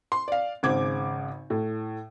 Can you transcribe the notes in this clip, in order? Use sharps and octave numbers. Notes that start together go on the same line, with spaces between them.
C6
D5 F5
G#1 C#3 C5 D6 G#6
A2